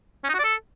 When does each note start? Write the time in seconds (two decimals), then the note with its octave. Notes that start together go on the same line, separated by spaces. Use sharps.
0.24 C#4
0.29 D#4
0.34 F#4
0.39 D5
0.44 A4